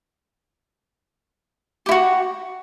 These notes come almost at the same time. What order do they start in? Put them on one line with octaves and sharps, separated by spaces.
G4 E4 F#4